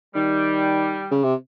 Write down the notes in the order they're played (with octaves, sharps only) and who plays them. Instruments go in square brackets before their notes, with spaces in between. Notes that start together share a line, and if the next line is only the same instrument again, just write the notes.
[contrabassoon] D#3 [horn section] G3
[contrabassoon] C#3
C3